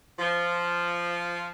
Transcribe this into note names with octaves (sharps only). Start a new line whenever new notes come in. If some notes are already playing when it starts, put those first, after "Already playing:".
F3